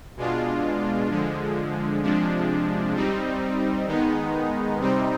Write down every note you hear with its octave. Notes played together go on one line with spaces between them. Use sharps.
B2 G#3 D4 F4
D3 F3 G#3
C3 F3 G#3 D4
G3 C4 D#4
D#3 G#3 B3 D#4
C3 G3 C4 D#4